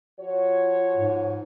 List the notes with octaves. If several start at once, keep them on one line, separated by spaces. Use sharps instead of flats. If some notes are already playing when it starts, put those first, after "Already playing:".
F3 F#4 C#5
G#2